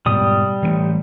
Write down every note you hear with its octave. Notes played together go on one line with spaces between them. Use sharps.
G#2 B2 G3 D#6
E3 F3 A3